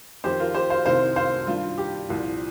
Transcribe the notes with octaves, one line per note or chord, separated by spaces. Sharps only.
F2 D#3 G4 C5
F4 A#4
G4 C5
C5 F5
C2 C3 D#3 C5 F5
C5 F5
G2 D#3 F4
G4
C2 A#2 F3